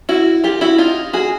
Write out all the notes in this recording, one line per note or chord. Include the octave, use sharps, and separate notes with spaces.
E4 F#4
F4 G4
E4 F#4
D#4 F4
F#4 G#4